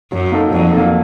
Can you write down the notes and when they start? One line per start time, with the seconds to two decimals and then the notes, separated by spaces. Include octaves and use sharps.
0.12 F#2 F#3
0.32 A#3 D#4 A4
0.52 F2 F#3
0.72 A#3 D#4 A4